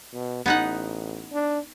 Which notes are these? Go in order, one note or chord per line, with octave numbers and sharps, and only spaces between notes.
B2
A1 B3 D#4 F#5
D4